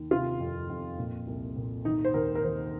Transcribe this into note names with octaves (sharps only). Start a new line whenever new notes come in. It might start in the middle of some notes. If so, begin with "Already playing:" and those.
Already playing: D#2 D#3
C3 F4
F2
F2
A#2
C2
A#2
D#3 D#4
C5
D#2 A#4
A#4
D#3 C5